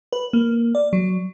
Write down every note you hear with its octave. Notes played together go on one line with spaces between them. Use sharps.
B4
A#3
D5
F#3